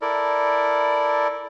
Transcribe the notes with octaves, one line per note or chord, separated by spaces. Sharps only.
E4 A4 A#4 D5